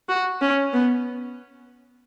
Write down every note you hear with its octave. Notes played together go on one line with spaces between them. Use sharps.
F#4
C#4
B3